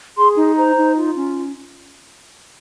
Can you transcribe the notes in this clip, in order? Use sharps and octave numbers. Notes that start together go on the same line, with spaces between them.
G#4 C6
D#4
C5 A#5
D#4
F4
C#4